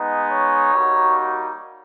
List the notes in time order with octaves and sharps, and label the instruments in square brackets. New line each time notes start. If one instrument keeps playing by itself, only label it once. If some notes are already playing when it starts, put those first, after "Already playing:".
Already playing: [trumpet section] G#3 B3 D#4
C#5
G3 A#3 D#4 F#4